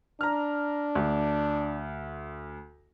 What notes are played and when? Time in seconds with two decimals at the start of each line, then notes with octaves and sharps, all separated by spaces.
0.21 D4 A#5 F6
0.95 D2